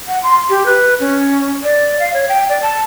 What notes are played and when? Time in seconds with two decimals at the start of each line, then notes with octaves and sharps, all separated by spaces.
0.08 F#5
0.23 C6
0.49 G4
0.66 B4
1.00 C#4
1.63 D5
1.99 F5
2.14 C#5
2.29 G5
2.49 D5
2.62 A5